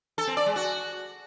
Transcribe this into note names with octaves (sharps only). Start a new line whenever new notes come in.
A4
C4
D5
G#3
F#4